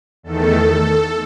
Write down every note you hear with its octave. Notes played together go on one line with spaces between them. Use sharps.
E2 D#3 A3 A4